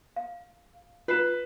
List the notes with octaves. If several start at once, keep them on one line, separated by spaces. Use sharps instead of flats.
F5
F4 B4 C7 E7